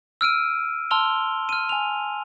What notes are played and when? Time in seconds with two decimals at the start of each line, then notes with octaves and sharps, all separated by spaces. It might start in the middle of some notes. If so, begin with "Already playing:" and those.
0.21 E6 F6 D7 D#7
0.91 A5 C6 E6 F6 F7 G7
1.49 F6 D#7
1.69 G#5 F7